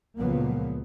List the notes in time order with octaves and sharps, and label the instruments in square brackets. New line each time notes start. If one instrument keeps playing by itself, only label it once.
[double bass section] C#2 A#2 F3 F#3 A#3 B3